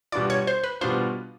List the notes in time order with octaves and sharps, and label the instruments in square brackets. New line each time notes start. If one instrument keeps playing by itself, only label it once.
[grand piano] B2 G3 B3 D4 F4 [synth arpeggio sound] D5
[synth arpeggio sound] C#5
C5
B4
[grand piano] B2 G3 B3 D4 F4 [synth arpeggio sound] C5